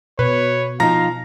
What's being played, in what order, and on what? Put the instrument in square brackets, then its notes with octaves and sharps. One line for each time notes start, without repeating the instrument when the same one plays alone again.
[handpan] B2 [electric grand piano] B4 [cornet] C#5
[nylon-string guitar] F3 D#4 [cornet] F5 [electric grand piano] A#5 A#6